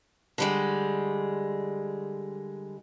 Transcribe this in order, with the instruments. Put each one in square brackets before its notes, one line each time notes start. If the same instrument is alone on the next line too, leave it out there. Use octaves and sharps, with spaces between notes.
[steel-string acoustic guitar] D3 G3 G#3